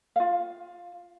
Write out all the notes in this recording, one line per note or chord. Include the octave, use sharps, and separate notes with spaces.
F4 F5